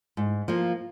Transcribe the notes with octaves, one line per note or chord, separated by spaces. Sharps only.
G#2
F3 A#3